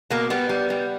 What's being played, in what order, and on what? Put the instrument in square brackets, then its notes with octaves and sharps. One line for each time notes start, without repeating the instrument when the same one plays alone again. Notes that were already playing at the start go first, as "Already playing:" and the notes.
[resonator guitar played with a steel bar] B2 A#3
G3 B3
G3
G3